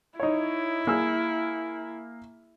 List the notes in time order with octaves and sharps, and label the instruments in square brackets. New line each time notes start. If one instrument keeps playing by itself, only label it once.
[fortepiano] D#4 C#5 [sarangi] E4
[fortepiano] A#3 G#4 E6